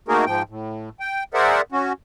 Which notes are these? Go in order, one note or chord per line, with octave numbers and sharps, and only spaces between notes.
A3 A#3 D#4 F#4 G#4 A#4
G#2 F3 G5
A2
G5
G#4 A#4 C5 D5 E5 F#5
C#4 F#4